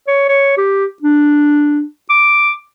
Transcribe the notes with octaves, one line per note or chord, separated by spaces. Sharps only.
C#5
C#5
G4
D4
D6